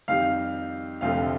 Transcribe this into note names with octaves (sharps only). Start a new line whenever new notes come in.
F2 D#3 G3 F5
F1 F2 D3 F3 A3 F5